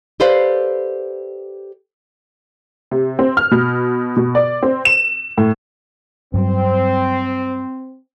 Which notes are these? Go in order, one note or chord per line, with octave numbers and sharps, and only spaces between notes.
G4 A4 B4 C5 D5 F5
C3
C4
F6
B2
B2
D5
C4
E7
A2
G2 F#3 C4